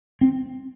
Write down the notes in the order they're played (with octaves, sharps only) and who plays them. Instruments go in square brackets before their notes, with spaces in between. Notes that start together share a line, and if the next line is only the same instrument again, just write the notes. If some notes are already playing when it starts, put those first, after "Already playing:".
[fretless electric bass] C4